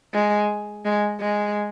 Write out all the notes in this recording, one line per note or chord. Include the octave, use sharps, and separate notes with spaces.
G#3
G#3
G#3